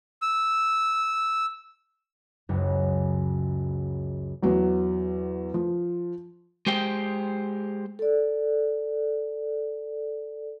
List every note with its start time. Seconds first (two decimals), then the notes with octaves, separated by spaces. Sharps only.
0.22 E6
2.49 F#1 C#2 F#2 C#6
4.43 E2 F#3
5.54 F3
6.67 G#3 G4 C5 G5
7.99 A4 D5